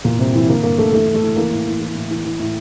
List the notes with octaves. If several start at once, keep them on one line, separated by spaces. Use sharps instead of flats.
A#2 E3 A#3
G2 C3 C4
E3 E4
D3 A#3 A#4
G2 A#3 A#4
D3 A3 A4
E3 A3 A4
A2
A3 A4
E3
E3 A#3 A#4
A2
E3
E3
A2
E3
E3
A2